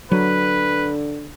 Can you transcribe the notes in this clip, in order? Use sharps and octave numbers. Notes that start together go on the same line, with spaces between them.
D3 F#3 B4